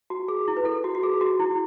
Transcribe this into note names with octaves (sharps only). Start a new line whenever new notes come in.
F#4
G#4
E4
B4
A4
F#4
F#4
G#4
F#4
E4